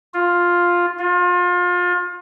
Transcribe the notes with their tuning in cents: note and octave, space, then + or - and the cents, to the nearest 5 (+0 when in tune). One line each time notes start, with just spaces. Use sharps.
F4 +5
F4 +30